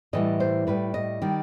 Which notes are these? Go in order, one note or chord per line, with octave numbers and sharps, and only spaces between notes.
A2 E3 G3 D#5
C5
A2 G3 B4
D#5
D#3 G3